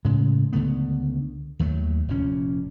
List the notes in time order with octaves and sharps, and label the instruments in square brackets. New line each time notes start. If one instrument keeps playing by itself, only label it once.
[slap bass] A2 C#3 G#3
C#2 D3 A3 B3
D#2 D#3 F#3 A3
F1 A#2 C#4